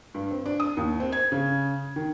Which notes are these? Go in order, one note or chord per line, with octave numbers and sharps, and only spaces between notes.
G2
C4
D4
D#6
D#2
C4
G#6
C#3
D#3